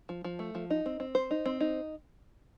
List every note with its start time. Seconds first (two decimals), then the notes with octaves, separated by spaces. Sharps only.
0.09 F3
0.24 F3
0.39 A3
0.55 F3
0.70 D#4
0.86 C4
1.00 C4
1.15 C5
1.31 D#4
1.46 C4
1.60 D#4